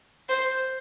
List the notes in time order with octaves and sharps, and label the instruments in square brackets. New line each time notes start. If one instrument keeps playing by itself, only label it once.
[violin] C5